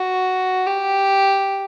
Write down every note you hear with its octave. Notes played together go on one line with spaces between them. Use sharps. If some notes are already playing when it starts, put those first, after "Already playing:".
Already playing: F#4
G4